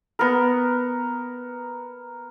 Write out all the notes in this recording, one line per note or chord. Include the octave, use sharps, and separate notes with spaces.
B3 A#4